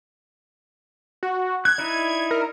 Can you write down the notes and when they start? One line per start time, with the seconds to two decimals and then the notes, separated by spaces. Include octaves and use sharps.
1.23 F#4
1.65 F#6 G#6
1.78 D#4 E4 D5 G#6
2.31 A#4